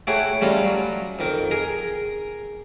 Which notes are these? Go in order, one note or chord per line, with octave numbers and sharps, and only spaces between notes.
A3 E4 F#4 G#4 C#5 G5
G3 A3 C#4 F4 A#5
F#3
F2 D#3 A#4
G#4 A#4 A#5